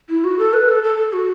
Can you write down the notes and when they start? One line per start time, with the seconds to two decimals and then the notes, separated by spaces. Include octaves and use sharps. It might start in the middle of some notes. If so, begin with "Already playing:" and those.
0.09 E4
0.24 F#4
0.39 A4
0.53 B4
0.69 A4
0.83 A4
0.98 A4
1.13 F#4